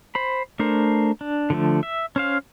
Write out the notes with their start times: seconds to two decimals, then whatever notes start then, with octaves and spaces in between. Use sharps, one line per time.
0.15 C5 B5
0.59 A3 D4 A#4 C5
1.21 D4
1.50 D3 F3 A3
1.83 E5
2.16 C#4 C5 F5